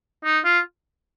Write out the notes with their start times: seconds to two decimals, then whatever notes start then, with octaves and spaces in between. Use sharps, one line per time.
0.25 D#4
0.44 F4